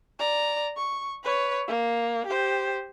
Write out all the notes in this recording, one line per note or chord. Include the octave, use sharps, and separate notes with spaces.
D5 A#5
C#6
B4 C#5
A#3
G4 C5